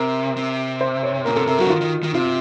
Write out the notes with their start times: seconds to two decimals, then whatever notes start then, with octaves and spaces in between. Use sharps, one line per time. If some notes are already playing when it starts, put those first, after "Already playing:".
Already playing: C3 A#4
0.37 C3
0.81 C5
1.03 C#5
1.25 A#2 A#4
1.36 C3 A4
1.47 C3 A#4
1.59 F#3 F#4
1.65 C#3
1.70 D#3 F4
1.81 D#3
2.03 D#3
2.14 C3 F4